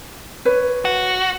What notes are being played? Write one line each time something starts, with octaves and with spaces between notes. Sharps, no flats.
B4 C#5
F#4